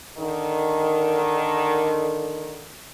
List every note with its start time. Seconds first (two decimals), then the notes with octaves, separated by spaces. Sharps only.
0.18 D3 D#3